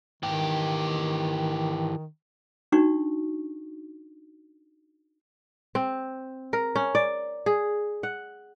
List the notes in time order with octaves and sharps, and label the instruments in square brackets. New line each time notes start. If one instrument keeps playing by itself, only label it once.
[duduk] D#3 [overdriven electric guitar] E3 G4
[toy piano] D4 D#4 F#4 C#6
[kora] C4
A#4
C#4
D5
G#4
F#5